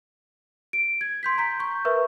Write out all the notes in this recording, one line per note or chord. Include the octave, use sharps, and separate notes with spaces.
D7
G#6
C6 G6 B6
A#5 G6 B6
C#6 G6
A#4 B4 E5 C#6